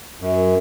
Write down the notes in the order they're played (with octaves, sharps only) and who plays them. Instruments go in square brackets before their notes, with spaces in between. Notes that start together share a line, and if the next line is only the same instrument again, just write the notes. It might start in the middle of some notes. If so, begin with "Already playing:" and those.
[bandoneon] F#2